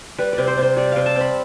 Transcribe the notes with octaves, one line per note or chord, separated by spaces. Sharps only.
G3 B4
D5
C3
C5
C3 C5
G3 D5
C3 F5
A5
C4
B5